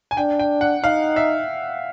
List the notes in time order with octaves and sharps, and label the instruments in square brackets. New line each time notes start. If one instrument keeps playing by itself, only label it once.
[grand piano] G#5
[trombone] D4 [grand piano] G5
[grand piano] G5
F#5
[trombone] D#4 [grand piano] F5
[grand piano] E5